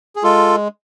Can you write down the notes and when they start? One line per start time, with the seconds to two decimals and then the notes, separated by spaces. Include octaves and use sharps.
0.16 G#4
0.23 G#3 F4 A4